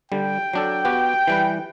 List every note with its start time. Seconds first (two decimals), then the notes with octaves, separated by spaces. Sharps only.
0.12 D3 G3 G5
0.53 F#3 D4 A4
0.85 B3 F#4 G4
1.27 E3 G3 B4